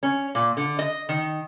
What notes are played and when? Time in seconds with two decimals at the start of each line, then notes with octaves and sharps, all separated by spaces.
0.03 C#4
0.35 A#2
0.57 D3
0.79 D#5
1.09 D#3